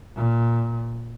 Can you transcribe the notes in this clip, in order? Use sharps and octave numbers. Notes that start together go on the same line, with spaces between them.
A#2